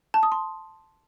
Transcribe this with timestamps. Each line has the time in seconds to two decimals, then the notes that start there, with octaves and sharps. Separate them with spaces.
0.14 A5
0.23 D#6
0.32 C6